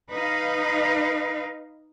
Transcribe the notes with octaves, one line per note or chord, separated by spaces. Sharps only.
D#4 B4 F5